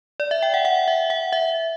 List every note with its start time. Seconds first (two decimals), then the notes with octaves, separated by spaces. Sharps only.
0.20 D5
0.31 E5
0.42 G5
0.54 F#5
0.65 F#5
0.88 E5
1.10 F#5
1.32 E5